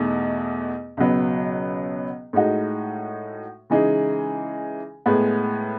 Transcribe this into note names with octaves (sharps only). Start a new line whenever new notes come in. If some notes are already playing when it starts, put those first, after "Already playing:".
Already playing: E2 B2 A3 D#4
C#2 B2 F#3 B3
A2 G#3 D#4 F#4
C#3 E3 G#3 D#4 G#4
A2 G#3 B3